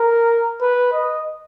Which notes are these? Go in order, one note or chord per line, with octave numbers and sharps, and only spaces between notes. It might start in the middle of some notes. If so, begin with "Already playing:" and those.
Already playing: A#4
B4
D#5